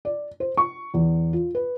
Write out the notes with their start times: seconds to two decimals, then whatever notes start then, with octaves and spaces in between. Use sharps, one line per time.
0.05 D5
0.40 C5
0.57 C#6
0.94 E2
1.33 F4
1.55 B4